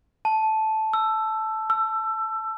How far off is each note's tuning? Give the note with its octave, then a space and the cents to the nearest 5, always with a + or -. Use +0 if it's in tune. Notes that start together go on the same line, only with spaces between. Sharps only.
A5 -10
E6 +15
E6 +25